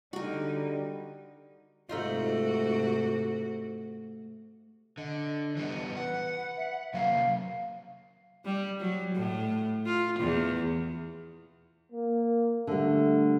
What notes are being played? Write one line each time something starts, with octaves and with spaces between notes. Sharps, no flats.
D3 G3 D#4 F#4 A#4
G#2 C3 A3 D#4 F4 F#4
D3 D#5
E3 G3 B3
B4 F#5
E5
C3 F#3 A#3 F5
G3
F#3
A2
F4
E2
A#3
D3 G3 A3